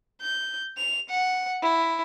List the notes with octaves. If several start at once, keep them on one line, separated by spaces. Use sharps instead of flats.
G6
F7
F#5
E4